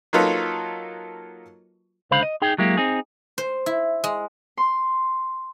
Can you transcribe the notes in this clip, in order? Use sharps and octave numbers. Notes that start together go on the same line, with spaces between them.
F#3 A#3 D#4 F4 A4 B4
C#2 D3 C5 F5 B5
D#5
D#4 G#4 G5
F#3 G#3 A#3 E4 G4
C4 D#4 G#4
C5
E4
G#3
C6